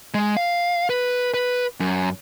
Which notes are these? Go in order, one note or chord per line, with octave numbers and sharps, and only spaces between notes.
G#3
F5
B4
B4
F#2